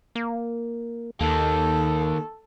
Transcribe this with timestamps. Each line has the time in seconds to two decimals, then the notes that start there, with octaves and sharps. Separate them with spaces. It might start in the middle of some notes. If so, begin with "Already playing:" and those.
0.15 A#3
1.21 D#2 D#3 A#3 A4